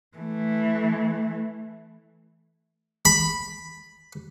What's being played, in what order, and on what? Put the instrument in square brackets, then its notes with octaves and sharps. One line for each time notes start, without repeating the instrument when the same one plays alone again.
[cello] E3 A3
[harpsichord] B5